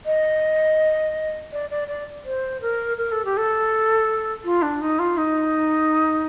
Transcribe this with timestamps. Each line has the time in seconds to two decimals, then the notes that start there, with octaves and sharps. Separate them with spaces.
0.05 D#5
1.52 D5
1.70 D5
1.88 D5
2.24 C5
2.61 A#4
2.97 A#4
3.11 A4
3.25 G4
3.37 A4
4.44 F4
4.62 D4
4.81 D#4
4.99 F4
5.17 D#4